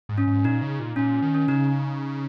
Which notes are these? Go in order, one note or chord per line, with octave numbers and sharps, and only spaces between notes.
G#2
C#4
G#2
A#2 D#4
C#3
A#2
A#2 C#4
D#3
C#4
C#3 D#4